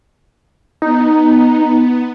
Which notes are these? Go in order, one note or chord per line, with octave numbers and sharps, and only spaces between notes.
B3 D#4